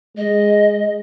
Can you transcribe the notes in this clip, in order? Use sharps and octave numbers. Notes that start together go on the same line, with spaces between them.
G#3 D#5